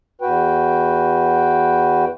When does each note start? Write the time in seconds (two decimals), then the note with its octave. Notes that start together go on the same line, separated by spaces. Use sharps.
0.22 E2 F#4 B4 G5